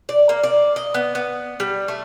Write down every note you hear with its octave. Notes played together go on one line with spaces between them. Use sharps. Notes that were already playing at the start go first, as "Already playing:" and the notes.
D5
A#3
D5
D#5
B3
B3
G3
A3